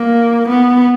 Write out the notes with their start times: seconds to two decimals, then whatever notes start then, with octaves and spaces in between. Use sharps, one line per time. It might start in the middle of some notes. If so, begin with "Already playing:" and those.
Already playing: A#3
0.49 B3